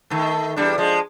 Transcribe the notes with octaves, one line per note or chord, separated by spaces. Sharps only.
D#3 A3
E2 G3 D4
F3 G#3